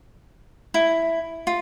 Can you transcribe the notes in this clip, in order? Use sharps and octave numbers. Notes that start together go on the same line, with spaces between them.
E4
F4